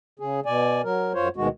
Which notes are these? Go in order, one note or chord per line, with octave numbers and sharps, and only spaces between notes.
C#3 G#4
B2 D5 G#5
F#3 A#4
F#2 F4 C5 C#5
D2 B2 D#3 G#3 F#4